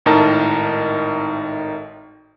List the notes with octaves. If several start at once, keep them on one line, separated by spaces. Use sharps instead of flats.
G#1 A2 D#4 A#4 A5